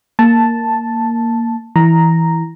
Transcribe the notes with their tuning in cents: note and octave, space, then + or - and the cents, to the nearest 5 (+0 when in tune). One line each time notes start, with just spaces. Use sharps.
A#3 -5 A5 +0
E3 +0 A#5 +0